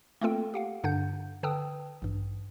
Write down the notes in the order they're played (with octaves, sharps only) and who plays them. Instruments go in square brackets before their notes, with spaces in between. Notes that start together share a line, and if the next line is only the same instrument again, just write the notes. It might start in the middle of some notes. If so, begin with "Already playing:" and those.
[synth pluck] A3 A#3 C4 F4 A4 G5
G4 F5 F#5
G2 D3 D4 F#5 G6
D3 B4 G5 A5 D#6 E6
A1 G2